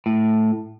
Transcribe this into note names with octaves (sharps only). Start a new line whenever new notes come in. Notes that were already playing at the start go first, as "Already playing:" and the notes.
A2